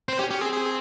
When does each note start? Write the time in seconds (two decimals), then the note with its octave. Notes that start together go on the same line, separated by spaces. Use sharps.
0.08 C4 C5
0.19 C#4 G4
0.30 C#4 G4
0.41 C4 G#4
0.52 G#4